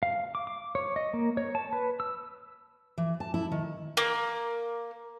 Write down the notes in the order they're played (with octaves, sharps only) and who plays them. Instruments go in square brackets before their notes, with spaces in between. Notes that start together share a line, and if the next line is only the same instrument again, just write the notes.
[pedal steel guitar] F5
D6
D6
C#5
D#5
A#3
C#5
A5
B4
E6
[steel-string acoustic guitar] E3
A5
E4
D#3
[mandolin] A#3